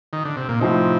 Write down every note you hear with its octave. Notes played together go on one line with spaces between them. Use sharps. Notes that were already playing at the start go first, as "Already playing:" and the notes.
D#3
D3
C3
A#2
A2 C3 F3 C4 D#4